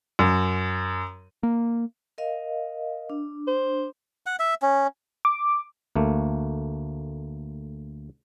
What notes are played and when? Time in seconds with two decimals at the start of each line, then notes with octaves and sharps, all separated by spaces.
0.19 F#2
1.43 A#3
2.18 A#4 D#5 F5
3.10 D4
3.47 C5
4.26 F#5
4.39 E5
4.62 C#4
5.25 D6
5.96 D2 A3 A#3